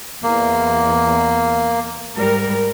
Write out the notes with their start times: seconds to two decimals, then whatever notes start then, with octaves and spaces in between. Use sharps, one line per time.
0.23 E2 A#3
2.15 G#2 G3 A#4